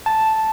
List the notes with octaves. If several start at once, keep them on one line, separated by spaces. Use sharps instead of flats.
A5